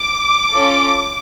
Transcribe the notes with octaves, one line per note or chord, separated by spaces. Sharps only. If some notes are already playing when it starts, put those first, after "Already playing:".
Already playing: D6
C#4 F4 A4